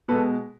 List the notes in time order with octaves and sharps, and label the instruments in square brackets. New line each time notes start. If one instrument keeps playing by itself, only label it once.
[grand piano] B2 G#3 A4 B4